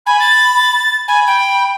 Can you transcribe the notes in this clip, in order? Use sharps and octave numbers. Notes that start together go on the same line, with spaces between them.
G#5 B5
A6
G#5 B5
G5